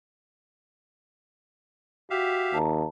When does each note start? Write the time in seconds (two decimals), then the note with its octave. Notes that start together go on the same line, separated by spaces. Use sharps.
2.10 F#4 G4 E5 F5
2.54 D#2 A5 A#5